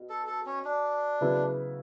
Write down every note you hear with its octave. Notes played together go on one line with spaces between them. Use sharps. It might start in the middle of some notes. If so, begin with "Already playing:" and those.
Already playing: B2
A4
A4
C#4
D4
C#3 F#3 B3 E4 B4